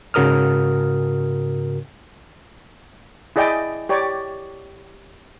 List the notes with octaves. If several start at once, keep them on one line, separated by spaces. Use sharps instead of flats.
G#2 C#3 F#4 A#4 D#6 F6
E4 G#4 D5 D#5 G5
G4 C#5 D5